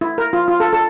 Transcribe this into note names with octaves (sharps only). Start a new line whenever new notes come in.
E4
A#4
F4
F4
A4
A4